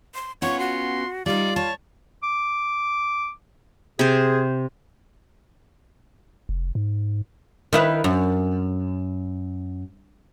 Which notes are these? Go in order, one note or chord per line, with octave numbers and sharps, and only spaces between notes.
C6
B3 C#4 F4 C#5 C#6
F#4 C6
G3 D#4 F4 D5
C#5 A5
D6
C3 G#4 C5
F1
G#2
D#3 E4 B4
F#2